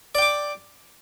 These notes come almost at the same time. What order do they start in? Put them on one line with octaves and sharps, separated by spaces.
D5 G5 D6